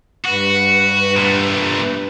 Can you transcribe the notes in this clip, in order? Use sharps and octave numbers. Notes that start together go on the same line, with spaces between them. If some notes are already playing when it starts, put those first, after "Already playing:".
G2 F#4 B4
A#2 A3